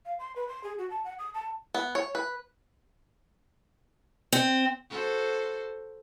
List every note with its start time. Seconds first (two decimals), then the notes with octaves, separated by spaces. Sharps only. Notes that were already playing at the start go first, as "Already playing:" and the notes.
0.05 F5
0.19 C6
0.36 B4
0.49 C6
0.64 G#4
0.78 F#4
0.90 A5
1.04 F#5
1.19 D#6
1.34 A5
1.74 B3
1.95 C#5
2.15 B4
4.32 C4
4.90 F#4 A4 C5